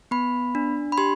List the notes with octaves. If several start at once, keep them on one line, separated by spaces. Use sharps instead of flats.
B3 B5
D4
B5
G4 C6